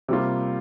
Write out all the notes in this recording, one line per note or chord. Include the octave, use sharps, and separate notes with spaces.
C3 G3 A#3 F4